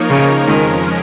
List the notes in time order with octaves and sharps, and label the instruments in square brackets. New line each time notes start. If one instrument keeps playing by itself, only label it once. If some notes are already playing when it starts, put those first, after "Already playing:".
Already playing: [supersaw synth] F3 A#3 D#4 A#4 C#5
[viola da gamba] C#3
[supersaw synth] F2 F3 G#3 C#4 A#4 [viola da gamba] D#3